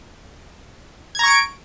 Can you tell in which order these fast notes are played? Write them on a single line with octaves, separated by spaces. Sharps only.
G#6 A#5 C#6 D7